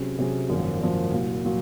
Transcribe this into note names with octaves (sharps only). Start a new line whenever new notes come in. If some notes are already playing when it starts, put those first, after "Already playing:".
Already playing: C3 F#3 C#4 G#4
C3 F#3 C#4 G#4
G#1 F#2 F3 A#3
G#1 F#2 F3 A#3
C2 A#2 F#3
A#2 F#3